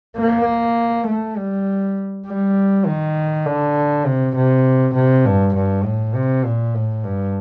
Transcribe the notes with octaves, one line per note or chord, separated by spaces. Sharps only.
A#3
A3
G3
G3
D#3
D3
C3
C3
C3
G2
G2
A2
C3
A#2
A2
G2